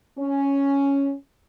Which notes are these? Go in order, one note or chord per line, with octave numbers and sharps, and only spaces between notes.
C#4